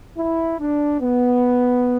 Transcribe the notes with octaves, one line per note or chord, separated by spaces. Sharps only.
E4
D4
B3